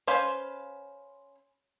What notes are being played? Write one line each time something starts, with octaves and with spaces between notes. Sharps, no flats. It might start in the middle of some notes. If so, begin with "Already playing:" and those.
C#4 B4 C5 F5